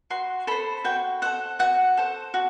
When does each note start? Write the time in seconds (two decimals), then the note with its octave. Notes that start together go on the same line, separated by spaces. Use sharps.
0.10 F#4 C6
0.47 A4 C5 B5
0.84 F#4 G5
1.22 A4 C5 F#5
1.59 F#4 F#5
1.97 A4 C5
2.34 F#4